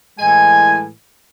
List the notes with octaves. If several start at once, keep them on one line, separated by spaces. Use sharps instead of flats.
A2 E3 G#3 G#5